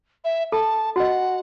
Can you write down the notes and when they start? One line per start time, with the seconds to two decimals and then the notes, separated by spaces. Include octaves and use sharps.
0.25 E5
0.52 A4 A5
0.96 F#4 D#5 F#5